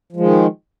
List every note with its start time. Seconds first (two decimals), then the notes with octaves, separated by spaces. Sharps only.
0.13 F3
0.16 G#3
0.20 D#3